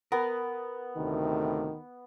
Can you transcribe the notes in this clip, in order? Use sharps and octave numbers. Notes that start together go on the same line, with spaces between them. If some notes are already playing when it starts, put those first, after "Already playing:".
B3 A#4
D2 A2 C3 D#3